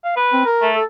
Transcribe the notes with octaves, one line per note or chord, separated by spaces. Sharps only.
F5
B4
C4
A#4
A3
A4